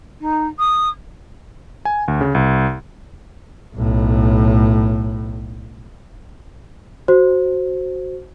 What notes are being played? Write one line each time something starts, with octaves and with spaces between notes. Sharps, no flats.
D#4
D#6
G#5
D2
C#3
C2
B1 A2
F#4 C5